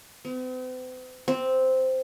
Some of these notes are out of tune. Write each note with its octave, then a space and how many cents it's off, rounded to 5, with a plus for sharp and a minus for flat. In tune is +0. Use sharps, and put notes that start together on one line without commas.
C4 -45
C4 -5